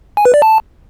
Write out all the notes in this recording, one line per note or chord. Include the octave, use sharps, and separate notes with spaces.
G#5
B4
D5
A5